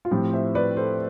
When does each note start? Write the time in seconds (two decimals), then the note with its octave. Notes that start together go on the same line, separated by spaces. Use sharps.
0.05 F4
0.11 A2 F3 C4 G4
0.33 C5 E5
0.55 B4 D5
0.77 A4 C5